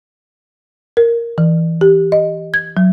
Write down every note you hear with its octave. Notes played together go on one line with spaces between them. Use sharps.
A#4
E3
G4
D#5
G#6
F#3